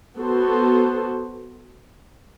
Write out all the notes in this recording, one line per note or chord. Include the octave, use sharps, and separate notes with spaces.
B3 F#4 A4 C5